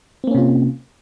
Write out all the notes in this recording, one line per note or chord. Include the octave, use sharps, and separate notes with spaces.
C3 A#3 C4 C#4 F4